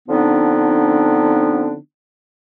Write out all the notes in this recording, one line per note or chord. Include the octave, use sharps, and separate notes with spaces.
D3 F3 B3 C4 D4 D#4